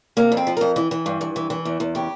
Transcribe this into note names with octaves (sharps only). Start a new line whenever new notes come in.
C3 A#3
F2
C4
F3
F2 A#4
E3
E3
G2
G2
E3
E3
E2
E2
C#3 G4